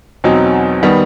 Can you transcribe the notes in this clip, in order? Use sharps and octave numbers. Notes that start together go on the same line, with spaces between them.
E2 B2 F#3 C4 D#4
D#3 G3 B3